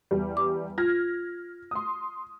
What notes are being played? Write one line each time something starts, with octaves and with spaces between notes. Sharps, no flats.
E2 G3
D6
F4 F6 G#6 A#6
C6 D#6